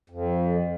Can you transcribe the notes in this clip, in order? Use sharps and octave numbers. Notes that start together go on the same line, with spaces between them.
F2